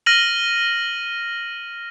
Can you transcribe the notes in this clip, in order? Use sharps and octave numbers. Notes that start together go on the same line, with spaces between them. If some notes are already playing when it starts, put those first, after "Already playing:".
F6 A#6 D#7 F#7